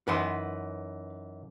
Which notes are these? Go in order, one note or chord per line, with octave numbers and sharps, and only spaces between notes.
F#2 E3 D#4 B4 F#5 C6